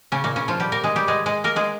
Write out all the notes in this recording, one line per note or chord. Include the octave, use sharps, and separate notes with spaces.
C#3 C#4
A#2 A#3
C#3 C#4
F3 F4
G3 G4
A#3 A#4
G#3 G#4
G3 G4
G#3 G#4
G#3 G#4
A#3 A#4
G#3 G#4